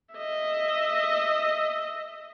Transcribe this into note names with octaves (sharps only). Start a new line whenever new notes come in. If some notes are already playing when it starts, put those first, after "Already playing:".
D#5 E5